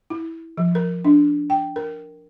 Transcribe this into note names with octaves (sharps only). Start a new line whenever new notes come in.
E4
F3
A#4
D4
G5
A#4